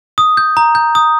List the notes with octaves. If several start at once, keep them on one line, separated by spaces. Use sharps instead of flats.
D#6
G6
A#5
G6
D#6